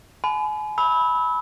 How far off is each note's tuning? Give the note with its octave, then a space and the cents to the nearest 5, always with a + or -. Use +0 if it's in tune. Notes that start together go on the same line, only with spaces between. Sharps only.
G#5 +40 B5 +30
B5 -5 E6 -30